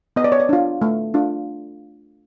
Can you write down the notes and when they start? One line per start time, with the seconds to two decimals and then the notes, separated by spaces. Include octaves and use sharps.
0.16 B3 D#5
0.24 D5
0.32 C#5
0.40 D5
0.49 D4 F4
0.82 A3
1.14 D4 F4